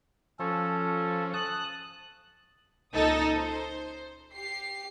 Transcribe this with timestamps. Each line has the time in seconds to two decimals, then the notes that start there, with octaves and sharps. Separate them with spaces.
0.39 F3 C#4 A4
1.34 A5 D#6 F#6
2.94 C#2 A#2 D#4 A4 D#6
3.37 C5
4.33 G4 C7